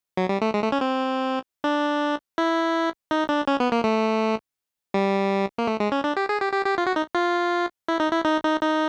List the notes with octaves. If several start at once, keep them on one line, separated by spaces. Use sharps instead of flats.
F#3
G3
A3
G#3
A3
C#4
C4
D4
E4
D#4
D4
C#4
B3
A#3
A3
G3
A#3
A3
G#3
C#4
D4
G4
G#4
G4
G4
G4
F4
F#4
D#4
F4
E4
D#4
E4
D#4
D#4
D#4